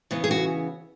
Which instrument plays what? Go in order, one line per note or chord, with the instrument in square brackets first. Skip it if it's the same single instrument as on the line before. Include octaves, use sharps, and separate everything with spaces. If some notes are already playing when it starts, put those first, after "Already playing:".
[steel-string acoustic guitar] C#3 E3 B3
G#4
F#4